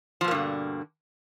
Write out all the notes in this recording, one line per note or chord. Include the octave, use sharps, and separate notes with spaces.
G2 B2 D3 F3 A#3